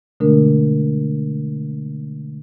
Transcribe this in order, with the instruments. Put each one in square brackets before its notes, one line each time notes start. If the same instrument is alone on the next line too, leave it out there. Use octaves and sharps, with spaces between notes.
[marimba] B2 D3 G#3 A3 D4 A#4